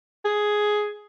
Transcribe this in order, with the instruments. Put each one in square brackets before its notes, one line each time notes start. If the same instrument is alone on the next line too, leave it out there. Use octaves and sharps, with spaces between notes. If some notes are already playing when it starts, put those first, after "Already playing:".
[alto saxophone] G#4